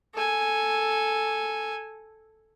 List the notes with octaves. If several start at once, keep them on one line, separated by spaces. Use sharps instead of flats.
A4 G#5